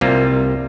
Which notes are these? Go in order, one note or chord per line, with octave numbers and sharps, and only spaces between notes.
C2 C3 G3 A#3 F4